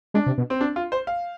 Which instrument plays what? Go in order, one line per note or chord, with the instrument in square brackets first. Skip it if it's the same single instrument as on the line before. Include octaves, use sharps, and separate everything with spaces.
[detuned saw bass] G#3 [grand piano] D4
[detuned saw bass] C3
B2
[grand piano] C4
D4
F4
C5
F5